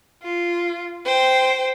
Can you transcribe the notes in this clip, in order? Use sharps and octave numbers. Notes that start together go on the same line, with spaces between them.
F4
C5 G5